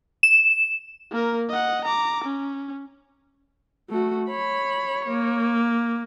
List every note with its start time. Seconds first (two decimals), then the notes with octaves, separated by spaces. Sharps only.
0.23 E7
1.11 A#3 A#4
1.49 D#5 F#5
1.85 A#5 D6
2.25 C#4
3.89 A3 F#4
4.30 C#5 B5
5.06 A#3